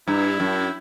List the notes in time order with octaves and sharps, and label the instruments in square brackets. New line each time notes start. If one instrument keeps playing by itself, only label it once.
[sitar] G2 [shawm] E4
[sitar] F#2